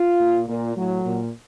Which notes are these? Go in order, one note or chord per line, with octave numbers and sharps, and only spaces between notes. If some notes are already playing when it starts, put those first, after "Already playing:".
Already playing: F4
A#2
A#2
A2 F#3
A#2